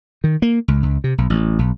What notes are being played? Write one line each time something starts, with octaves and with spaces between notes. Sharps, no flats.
D#3
A#3
C#2
C#2
C3
B1
A1
B1